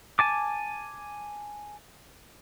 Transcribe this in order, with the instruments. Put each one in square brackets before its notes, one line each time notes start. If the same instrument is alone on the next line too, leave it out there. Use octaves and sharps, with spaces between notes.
[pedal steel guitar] G#5 A5 D6